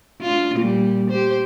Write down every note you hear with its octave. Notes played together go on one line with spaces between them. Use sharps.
D4 F4
A#2 G3
G4 C5